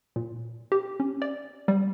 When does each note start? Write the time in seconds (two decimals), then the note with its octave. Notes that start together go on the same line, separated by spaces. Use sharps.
0.16 A#2
0.72 G4
1.00 C#4
1.22 D5
1.68 G3